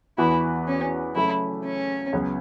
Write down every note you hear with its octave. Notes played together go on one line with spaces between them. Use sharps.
E2 E3 B3 E4 F#4 B4
C#4
C#3 F#3 A3 C#4 E4
C#4
C#2 C#3 F#3 B3